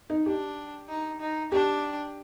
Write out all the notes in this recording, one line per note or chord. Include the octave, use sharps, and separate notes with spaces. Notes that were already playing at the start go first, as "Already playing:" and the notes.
D#4
D4 G4
D#4
D#4
D4 G4